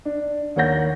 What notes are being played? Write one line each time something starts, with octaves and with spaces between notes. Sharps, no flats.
D4
D#2 A#3 C#5 F#5 G6 A#6